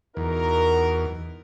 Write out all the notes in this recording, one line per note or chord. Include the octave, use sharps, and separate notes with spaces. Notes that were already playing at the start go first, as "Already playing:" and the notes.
E2 D#4 F#4 A#4